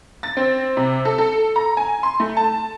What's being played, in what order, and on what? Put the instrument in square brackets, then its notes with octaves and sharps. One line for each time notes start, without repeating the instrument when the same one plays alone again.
[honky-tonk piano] A6
C4
C3
A4
A4
A#5
G#5
C6
A3
A5